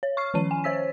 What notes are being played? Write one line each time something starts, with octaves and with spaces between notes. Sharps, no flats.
C#5
C#6 F6 C7
D#3 F3 C#4 D#7
G#5
C5 C#5 E6 B6